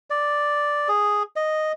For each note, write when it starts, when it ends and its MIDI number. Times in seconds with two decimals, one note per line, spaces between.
0.10 0.88 74
0.88 1.23 68
1.36 1.72 75